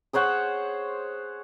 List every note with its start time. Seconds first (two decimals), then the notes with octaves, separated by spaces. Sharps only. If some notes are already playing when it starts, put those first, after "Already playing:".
0.13 G#4 C5 C#5 F#5